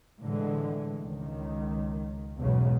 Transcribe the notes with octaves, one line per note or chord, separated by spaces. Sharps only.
A2 D3 E3 G#3
C#2 D#3
B1 E2 G#2 C#3